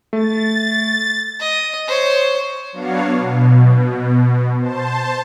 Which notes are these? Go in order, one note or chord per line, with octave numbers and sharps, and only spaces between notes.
A3 A6
D#5
C5 C#5
F#3 B3 D4 F#4 C#5 F5
B2
C5 A5